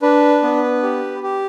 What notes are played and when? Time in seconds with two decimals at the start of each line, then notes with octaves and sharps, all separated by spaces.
0.02 D4 B4
0.43 B3
0.83 G4
1.23 G4